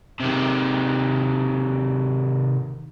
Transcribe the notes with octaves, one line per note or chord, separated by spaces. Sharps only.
C3 D#3